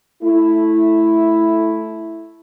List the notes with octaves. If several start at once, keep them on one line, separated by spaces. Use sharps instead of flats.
A3 E4